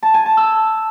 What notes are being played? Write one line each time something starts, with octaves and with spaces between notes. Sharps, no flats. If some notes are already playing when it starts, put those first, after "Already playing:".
A5
G#5
A5
E6